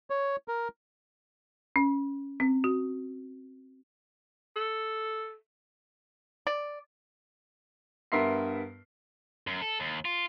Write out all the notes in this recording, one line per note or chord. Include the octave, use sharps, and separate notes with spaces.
C#5
A#4
C#4
C4
F#4
A4
D5
G2 B3 A#4 E5 C6 C7
F#2
A4
D#2
F4